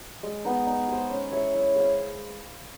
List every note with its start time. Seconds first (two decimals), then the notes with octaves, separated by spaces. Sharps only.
0.23 G#3
0.45 B3 D#4
0.67 D#4
0.88 G#4 C5
1.10 C#4
1.32 E4 G#4 C#5
1.54 E4
1.76 G#4 C5 F5